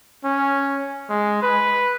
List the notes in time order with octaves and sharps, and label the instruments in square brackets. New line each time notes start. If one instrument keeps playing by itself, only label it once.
[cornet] C#4
G#3
B4